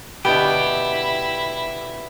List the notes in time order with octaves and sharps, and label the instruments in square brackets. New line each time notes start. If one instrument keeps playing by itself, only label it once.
[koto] B2 D3 B3 [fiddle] E4 [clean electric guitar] G4